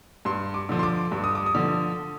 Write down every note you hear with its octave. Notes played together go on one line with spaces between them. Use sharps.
G2 C6
D6
D3 F3
C6
D6
G2
D#6
D6
D#6
D3 F3